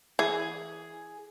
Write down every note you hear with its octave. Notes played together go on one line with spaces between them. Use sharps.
E3 G#4